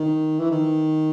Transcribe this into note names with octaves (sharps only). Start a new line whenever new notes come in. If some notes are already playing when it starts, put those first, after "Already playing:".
Already playing: D#3
E3
D#3